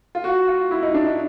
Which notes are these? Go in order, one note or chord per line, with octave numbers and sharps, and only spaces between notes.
F4
F#4
F4
E4
D#4
D4
D#4